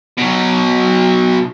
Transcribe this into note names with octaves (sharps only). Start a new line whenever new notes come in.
B2 F#3